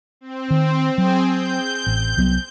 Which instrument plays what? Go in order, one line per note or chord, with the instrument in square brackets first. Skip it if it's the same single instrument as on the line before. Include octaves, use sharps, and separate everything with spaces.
[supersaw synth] C4
[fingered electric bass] D#3
[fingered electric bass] F#3 [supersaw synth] C4 G#4
[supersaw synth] G6
[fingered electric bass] A1
C2 F#3 B3